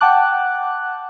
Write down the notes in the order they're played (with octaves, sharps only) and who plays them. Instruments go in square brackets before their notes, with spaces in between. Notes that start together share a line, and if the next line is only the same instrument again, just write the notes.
[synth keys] F#5 G5 A5 D6 F#6